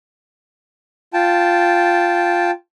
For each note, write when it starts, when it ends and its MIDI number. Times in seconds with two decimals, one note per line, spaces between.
1.14 2.51 65
1.14 2.51 79
1.14 2.51 81